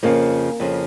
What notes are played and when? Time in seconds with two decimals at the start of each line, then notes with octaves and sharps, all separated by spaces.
0.03 F2 C#3 F3 A#3
0.60 F2 C#3 F3